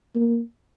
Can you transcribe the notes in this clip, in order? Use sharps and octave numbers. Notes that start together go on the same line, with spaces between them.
A#3